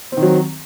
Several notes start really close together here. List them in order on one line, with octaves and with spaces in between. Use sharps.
C4 D#3 F#3